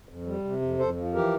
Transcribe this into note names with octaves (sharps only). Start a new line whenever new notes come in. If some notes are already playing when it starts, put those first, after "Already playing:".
F2
G3
C3
F2
F2 A4 C5
F3
E3 G4 A#4